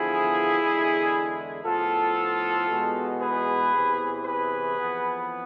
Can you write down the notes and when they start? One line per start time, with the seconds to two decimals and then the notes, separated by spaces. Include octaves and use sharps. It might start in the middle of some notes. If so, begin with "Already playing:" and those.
Already playing: E2 D3 F3 B3 E4 G#4
0.61 E2 D3 G#3
1.65 A2 F3 B3 F4 A4
2.70 E2 B2 G#3 B3
3.21 G#4 B4
3.74 E2 C3 E3
4.26 G#4 B4
4.79 F2 E3 B3